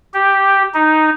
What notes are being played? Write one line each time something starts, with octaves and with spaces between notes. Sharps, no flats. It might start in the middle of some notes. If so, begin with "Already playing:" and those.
G4
D#4